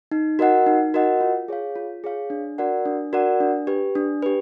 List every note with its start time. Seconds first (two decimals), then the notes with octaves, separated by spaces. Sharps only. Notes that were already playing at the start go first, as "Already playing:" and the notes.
0.11 D#4
0.39 F#4 A#4 D#5 F#5
0.66 D#4
0.94 F#4 A#4 D#5 F#5
1.21 F4
1.48 G#4 C#5 F5
1.76 F4
2.04 G#4 C#5 F5
2.30 D4
2.58 F#4 A#4 D5 F#5
2.85 D4
3.13 F#4 A#4 D5 F#5
3.40 D4
3.67 G4 B4
3.95 D4
4.22 G4 B4